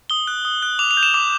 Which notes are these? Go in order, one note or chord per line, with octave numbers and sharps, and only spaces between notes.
D#6 G7
F#6
D#6
F#6
D6 F7
F7
G6
E7
D6